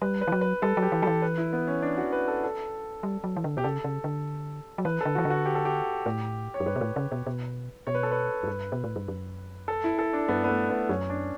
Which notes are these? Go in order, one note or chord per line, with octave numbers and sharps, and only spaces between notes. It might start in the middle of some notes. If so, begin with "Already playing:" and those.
G3 B4
B4
E3
F#3
B4
G3 A4
F#3
G4
E3
E3 F#3 A4
B4
E4
B3
C#4
D4
F#4
B4
A4
A4
G3
F#3
E3
D3
B2 G4
C#3 A4
C#3
D3
F#3
E3 B4
D3 A4
E3 F#4
D3
F#4
G4
A4
G4
A2
C#5
F#2
G2 B4
B2
A2
C#3
B2
B2
B2 C#5
B4
A4
B4
F#2
G2
B2
A2
G2
F#2
A4
E4
A4
D4
G2 B3
B3
A3
B3
F#2 C#4
D4